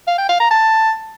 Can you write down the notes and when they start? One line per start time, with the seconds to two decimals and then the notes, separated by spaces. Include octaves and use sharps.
0.07 F5
0.18 G5
0.29 F5
0.40 A#5
0.51 A5